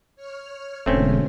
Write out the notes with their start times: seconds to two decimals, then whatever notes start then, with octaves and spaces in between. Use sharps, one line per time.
0.16 C#5 F6
0.86 E1 G#2 B2 D3 A3 C4 C#4